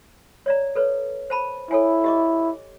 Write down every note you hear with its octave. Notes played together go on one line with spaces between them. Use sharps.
C#5 D5 A#5
A4 B4 C#5
C5 A5 B5
E4 A4 C#5 G#5
G4 D#5 D6